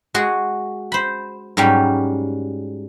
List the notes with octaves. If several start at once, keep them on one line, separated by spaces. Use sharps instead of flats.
G#3 F#4 G#4
C5 B5
G#2 F#3 G3 C#4 G4